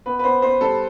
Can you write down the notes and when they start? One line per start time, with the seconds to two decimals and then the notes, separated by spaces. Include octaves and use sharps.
0.06 B3 B4
0.19 B4
0.24 B3 C5
0.42 B3 C5
0.61 G3 A4